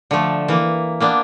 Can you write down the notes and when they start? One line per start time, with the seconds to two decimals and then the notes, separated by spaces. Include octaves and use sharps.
0.11 D3 F3 A3
0.48 E3 A#3
1.00 A#3 B3 D4